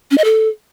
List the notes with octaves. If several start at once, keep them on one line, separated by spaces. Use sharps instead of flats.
C#4
D#5
A4